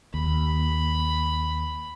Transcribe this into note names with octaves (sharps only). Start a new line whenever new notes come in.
D#2 B5